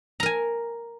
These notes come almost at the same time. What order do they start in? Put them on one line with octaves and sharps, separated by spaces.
A#5 A#4 G#5